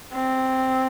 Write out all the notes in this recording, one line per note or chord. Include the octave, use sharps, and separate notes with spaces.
C4